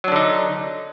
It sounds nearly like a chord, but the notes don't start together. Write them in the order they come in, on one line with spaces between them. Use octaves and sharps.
F#3 D4 D3 D#4